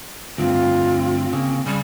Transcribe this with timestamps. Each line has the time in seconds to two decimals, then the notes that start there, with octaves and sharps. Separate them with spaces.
0.38 D2 G2 C4 F4
1.33 C#3 A#3
1.66 C#3 G3